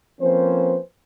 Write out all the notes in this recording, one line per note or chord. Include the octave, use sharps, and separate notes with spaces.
F3 A#3 C4 C#4 B4 C5